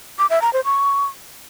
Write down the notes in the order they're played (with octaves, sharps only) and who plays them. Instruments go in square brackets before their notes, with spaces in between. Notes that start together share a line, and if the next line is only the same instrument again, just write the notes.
[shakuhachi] D6
E5
A#5
C5
C#6